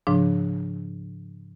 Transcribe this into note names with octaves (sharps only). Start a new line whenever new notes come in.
G#2 C#3 F3 D4